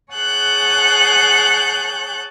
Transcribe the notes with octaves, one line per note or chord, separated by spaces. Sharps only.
G#4 C#5 F#5 A5 F#6 G6